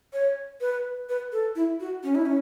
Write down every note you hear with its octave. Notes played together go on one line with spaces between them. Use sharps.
C#5
B4
B4
A4
E4
F#4
C#4
E4
C#4